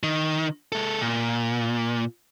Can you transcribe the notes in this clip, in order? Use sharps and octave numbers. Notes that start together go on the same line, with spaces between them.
D#3
G#3 A4
A#2